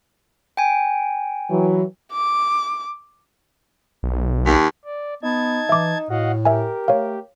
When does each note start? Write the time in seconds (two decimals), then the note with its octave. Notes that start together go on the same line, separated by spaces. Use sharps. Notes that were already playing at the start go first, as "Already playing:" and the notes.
0.57 G5 G#5
1.50 E3 F#3
2.13 D6
4.03 B1
4.46 D#2
4.85 D5
5.23 B3 D#4 A5 G#6
5.69 E3 E5 D6
6.10 A2 F#4 D#5 F5 F#5
6.45 G4 A#4 E5 G#5
6.88 A3 C#5 F5